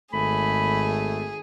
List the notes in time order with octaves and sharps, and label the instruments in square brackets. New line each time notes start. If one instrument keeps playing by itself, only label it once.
[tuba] G#1 [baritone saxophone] A3 [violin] G#4 [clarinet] B5